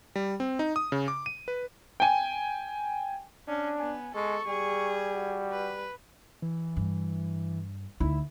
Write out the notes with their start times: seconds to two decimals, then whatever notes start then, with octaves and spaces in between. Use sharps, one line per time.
0.16 G3
0.40 C4
0.59 D#4
0.76 D#6
0.92 C#3
1.08 D6
1.26 D#7
1.48 B4
2.00 G5 G#5
3.48 C#4 D4
3.79 B3 G#5
4.15 G#3 A4 C#6
4.47 G3 G#4
5.13 F#4
5.52 B4
6.42 E3
6.77 G2
8.00 D2 D#4 E4